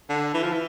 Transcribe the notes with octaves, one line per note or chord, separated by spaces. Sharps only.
D3
E3
F3
E3